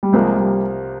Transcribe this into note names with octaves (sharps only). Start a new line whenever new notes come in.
G3
C2 C3 F3 G#3 A#3
G3